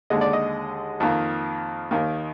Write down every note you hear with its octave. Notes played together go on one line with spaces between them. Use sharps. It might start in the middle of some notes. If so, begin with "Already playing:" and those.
D#2 D3 G#3 D#5
D5
D#5
F2 D#3 A#3
D#2 D#3 A#3